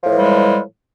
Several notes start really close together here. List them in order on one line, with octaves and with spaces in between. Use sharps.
F3 A2 E3 G3 G#3